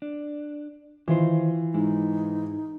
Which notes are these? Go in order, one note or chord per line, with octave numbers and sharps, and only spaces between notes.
D4
D#3 E3 F4 C5
G#2 G#3 D#4 E4